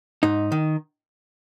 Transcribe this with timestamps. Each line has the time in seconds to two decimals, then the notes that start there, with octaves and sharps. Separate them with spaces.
0.23 G#2 D#4
0.52 D#3